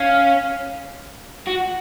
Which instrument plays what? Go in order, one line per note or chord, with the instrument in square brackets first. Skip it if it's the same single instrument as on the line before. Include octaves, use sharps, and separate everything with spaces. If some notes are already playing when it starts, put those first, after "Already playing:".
Already playing: [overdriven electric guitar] C#4 [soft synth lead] F5
[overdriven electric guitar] F#4 [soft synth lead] F#5